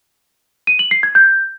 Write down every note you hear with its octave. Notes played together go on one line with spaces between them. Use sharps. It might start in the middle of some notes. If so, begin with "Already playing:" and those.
D#7
F#7
C7
G#6
G6